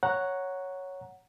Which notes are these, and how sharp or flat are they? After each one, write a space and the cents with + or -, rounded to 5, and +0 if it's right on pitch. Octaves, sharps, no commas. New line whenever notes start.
C#5 +0 F#5 +0 A#5 +0